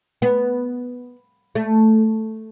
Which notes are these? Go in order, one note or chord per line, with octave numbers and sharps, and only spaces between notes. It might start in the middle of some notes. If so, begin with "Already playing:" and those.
B3
A3